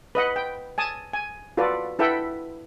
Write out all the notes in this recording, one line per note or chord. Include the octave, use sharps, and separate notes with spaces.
B4 D#5 F#5
G5
G#5 A5 D#6
G#5
F4 F#4 A4 B4 D5
E4 A4 B4 E5 F#5 G5